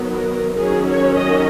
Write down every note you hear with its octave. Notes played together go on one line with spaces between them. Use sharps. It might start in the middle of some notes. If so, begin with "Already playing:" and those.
Already playing: D#3 F#3 B3
A#4
D#3 F#3 C#4 G#4
C#5
D#5